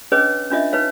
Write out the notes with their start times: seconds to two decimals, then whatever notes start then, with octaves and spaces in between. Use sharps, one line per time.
0.12 C#4 D4 G#4 B4 C#5 D#5
0.50 C#4 D4 F4 D#5 E5
0.73 D#4 B4 C#5 F5